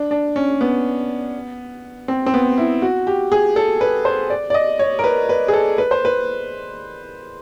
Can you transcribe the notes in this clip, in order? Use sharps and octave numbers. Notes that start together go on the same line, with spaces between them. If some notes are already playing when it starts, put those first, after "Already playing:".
Already playing: D4
D4
C#4
B3
C4
C4
B3
E4
F#4
G4
G#4
A4
B4
C5
D5
D5
D#5
C#5
A#4
B4
B4
G#4
A4
B4
C5
B4